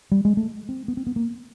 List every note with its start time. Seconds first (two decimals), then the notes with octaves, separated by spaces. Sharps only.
0.12 G3
0.25 G#3
0.37 A3
0.69 C4
0.88 B3
0.97 C4
1.07 B3
1.16 A#3